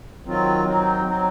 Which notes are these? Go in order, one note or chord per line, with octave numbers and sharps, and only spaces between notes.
D#3 F#3 C4 F4
F#3 C4 D#4
F#3 C4 D#4